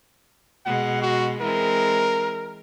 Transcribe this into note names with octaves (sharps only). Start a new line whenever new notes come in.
B2 G#3 F#5
F#4
E3 G#3 C4 A#4